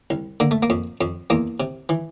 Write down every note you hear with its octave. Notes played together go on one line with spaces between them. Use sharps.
C2
D3 A#3
A3
A#3
F2
F2
E2 A#3
C3
E3